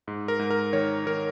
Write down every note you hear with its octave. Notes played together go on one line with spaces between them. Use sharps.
G#2
A#4
G#2
A#4
D#3 C#5
D#3 A#4